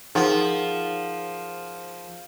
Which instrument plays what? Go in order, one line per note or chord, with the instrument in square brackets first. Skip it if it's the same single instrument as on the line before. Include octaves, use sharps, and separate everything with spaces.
[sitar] F3 [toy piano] D#4 G5 C6 [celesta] G#4 A#4 F#5